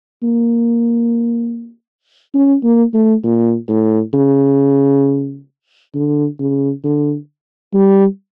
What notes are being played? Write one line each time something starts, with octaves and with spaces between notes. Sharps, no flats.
A#3
C#4
A#3
A3
A#2
A2
C#3
D3
C#3
D3
G3